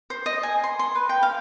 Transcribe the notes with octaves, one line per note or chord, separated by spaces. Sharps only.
C5
D#5
G#5
C6
C6
B4
G5
F5